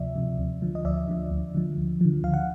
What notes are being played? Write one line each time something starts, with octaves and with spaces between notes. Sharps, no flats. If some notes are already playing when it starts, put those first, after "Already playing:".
Already playing: D2 C3 F3 D5 E5
C3 F3
D2
D3 F3
D#5
D2 D5 E5
D3 F3
D2
D3 F3
D2
D3 F3
D2 F5
F#5